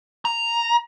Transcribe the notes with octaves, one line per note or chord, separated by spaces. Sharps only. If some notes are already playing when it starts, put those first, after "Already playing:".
A#5